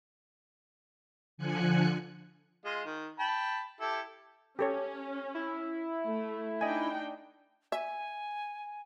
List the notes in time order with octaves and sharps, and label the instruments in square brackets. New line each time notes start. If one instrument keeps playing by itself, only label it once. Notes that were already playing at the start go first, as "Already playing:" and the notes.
[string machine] D3 F3 G#5 F#6 C#7
[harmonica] G#3 F4 D#5
D#3
G5 A5 B5
E4 G4 A4
[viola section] C#4 [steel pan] G4 A4 C#5
[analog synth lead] E4
[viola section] A3
[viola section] D4 D#4 G5 [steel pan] D#5 G#5
[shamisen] E5 [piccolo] G#5